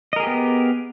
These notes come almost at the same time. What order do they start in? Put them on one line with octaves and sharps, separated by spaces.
D#5 A#4 G#4 G4 B3